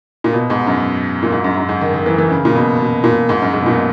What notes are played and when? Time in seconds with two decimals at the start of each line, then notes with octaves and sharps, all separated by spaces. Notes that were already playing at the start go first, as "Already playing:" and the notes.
0.24 A#2
0.33 B2
0.50 G#2
0.67 F#2
1.23 A#2
1.32 G#2
1.44 F#2
1.57 F#2
1.69 G#2
1.81 D#3
1.94 D#3
2.06 E3
2.18 E3
2.31 C#3
2.45 A#2
2.55 B2
2.80 B2
3.04 A#2
3.29 G#2
3.42 F#2
3.54 G#2
3.61 B2
3.66 A#2